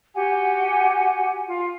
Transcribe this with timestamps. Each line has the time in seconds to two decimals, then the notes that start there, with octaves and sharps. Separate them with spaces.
0.14 F#4 G4 F#5 G#5
1.47 F4